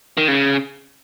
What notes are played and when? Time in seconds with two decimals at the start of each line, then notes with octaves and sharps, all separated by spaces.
0.17 D#3
0.28 C#3